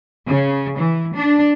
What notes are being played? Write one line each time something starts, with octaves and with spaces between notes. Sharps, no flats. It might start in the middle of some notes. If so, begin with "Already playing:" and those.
C#3
E3
D4